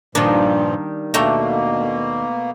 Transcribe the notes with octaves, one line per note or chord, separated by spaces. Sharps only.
G2 A#2 D#3 F3 G3 A#3 D4
D#2 B2 A3 A#3 D4 G5 A#5